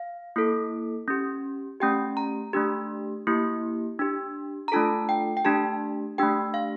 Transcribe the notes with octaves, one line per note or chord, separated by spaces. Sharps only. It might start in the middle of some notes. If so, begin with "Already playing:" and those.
Already playing: F5
A#3 E4 A4
C#4 G4
A3 C#4 G4 G5
A#5
A3 D4 G4
A#3 E4 G4
D4 G4
A#5
A3 D4 F4 A4 A5
G5
G5
A3 D4 G4 A5
A3 D4 G4 G5
F5